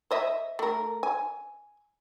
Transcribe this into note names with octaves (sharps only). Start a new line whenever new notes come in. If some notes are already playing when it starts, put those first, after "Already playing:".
C5 D#5 E5
A3 A#4
G#5